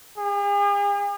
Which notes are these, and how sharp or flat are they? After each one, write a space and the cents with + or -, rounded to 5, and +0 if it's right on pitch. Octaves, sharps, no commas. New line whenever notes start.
G#4 -45